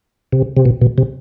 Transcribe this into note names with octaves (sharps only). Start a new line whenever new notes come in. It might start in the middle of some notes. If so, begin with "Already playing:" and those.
C3
C3
B2
B2
C3